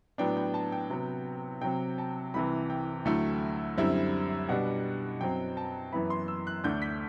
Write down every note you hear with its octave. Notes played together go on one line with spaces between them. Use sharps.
A2 F#3 B3 D4 G5
G5
A5
G5
C3 F#3 B3
C3 F#3 C4 G5
A5
C2 C3 E3 B5
G5
D2 D3 F#3 A3 E4
F#2 D3 G3 C4 E4
B2 G3 D4 F#5
F#2 F#3 C4 G5
A5
F#2 E3 B3 E4 B5
C6
E6
F#6
D2 D3 A3 D4 G6
B6